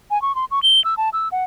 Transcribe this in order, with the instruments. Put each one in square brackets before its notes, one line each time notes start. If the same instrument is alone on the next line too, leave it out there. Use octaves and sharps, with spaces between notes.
[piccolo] G#5
C#6
C6
C#6
G7
E6
A5
E6
F#5